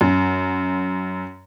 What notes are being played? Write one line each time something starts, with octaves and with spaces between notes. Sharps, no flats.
F#2